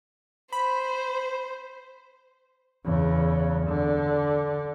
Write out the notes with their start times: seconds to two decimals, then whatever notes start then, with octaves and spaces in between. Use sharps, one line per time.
0.52 C5 B5
2.85 E2 C#3
3.67 D3